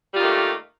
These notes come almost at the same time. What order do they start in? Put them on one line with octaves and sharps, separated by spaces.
G3 F4 D#3 A#3 A3